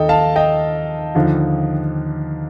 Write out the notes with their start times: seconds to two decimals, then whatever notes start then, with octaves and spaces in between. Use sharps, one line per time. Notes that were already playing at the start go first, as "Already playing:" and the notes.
Already playing: D#2 D#3 A4 D#5 G5
0.09 F5 A5
0.36 D#5 G5
1.15 D#2 D3 F3